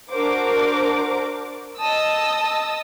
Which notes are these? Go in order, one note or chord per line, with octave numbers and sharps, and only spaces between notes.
D4 F#4 A#4 C5 D6
D#5 A5 D#6 E6